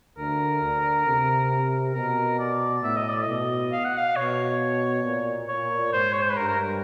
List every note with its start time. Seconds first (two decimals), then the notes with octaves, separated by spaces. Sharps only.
0.17 D2 D3 A#4
0.62 D2 D3
1.06 C3
1.94 B2 A#4
2.39 D5
2.83 A2 E5
2.97 D#5
3.09 D5
3.22 D#5
3.27 B2
3.72 F5
3.84 F#5
3.97 F5
4.16 B2 C#5
5.04 A#2
5.48 A#2 C#5
5.93 G#2 C5
6.13 C#5
6.22 C5
6.29 B4
6.37 G2 A#4
6.48 A#4